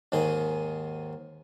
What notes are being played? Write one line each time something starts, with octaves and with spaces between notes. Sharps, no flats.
D#2 G#2 D#3 G#4 D#5